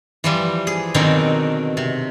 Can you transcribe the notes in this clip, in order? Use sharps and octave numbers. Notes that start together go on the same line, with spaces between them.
E3 F3 G3
G#4
B2 D3 D#3 F#3 C4 A#4
C3